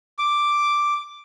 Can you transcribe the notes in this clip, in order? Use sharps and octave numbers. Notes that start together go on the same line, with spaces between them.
D6